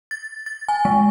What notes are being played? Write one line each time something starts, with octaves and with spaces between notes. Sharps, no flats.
A6
A6
G#5
G#3